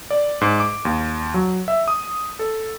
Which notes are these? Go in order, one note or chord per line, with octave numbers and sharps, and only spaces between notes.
D5
G#2
D6
D#2
F#3
E5
D#6
A4